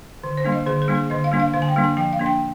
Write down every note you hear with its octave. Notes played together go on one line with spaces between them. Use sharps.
D3
C5
G3 A#3 D4
D#5
D3 G#4
G#4
G3 A#3 D4
G#4
D3 D#5
F5
G3 A#3 D4
F5
D3 F5
G#5
G5
G3 A#3 D4
G#5
F3 G5
F5
A#3 D4
G5